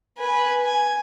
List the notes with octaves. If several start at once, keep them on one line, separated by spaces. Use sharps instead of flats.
B4 G#5
G#5